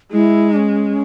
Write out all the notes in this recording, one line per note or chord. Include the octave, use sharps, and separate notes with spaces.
G#3 E4
C#4